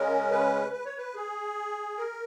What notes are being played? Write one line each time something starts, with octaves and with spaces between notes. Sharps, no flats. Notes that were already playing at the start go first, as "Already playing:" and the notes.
Already playing: C#3 G#3 C#4 A#4
B4
B4
C#5
B4
G#4
A#4